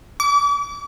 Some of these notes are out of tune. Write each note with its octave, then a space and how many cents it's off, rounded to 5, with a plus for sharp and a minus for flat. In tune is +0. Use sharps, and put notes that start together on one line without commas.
D6 -40